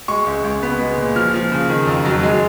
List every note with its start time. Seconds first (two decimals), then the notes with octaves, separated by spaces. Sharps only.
0.08 G#3 C#6
0.26 C#2
0.44 C#2
0.63 B3
0.80 G#3
0.98 A#2
1.16 F3 F6
1.34 F3
1.52 C#3
1.69 D#3
1.87 F2
2.05 F#3
2.23 G#3